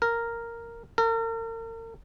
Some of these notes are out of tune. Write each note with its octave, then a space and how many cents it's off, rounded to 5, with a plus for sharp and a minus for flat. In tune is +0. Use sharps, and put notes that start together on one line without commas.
A#4 -5
A#4 -40